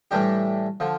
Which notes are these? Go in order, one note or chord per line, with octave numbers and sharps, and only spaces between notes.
A2 E3 G3 D4 G4
D3 F3